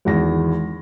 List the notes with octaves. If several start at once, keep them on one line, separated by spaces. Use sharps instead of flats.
G#1 E2 A#6